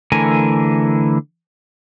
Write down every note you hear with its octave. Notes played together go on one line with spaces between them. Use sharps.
D3 E3 A3 A#4 G#5